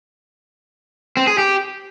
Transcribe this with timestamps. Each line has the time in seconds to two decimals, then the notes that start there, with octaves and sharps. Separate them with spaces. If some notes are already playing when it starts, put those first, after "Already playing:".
1.17 C4
1.27 G#4
1.38 G4